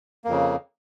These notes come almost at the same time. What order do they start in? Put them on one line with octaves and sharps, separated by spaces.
A#3 F2 C#3